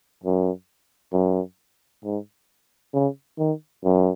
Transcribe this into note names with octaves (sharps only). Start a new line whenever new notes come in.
F#2
F#2
G#2
C#3
D#3
F#2